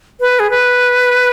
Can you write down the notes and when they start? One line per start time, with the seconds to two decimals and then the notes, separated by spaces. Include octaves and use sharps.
0.20 B4
0.40 G#4
0.50 B4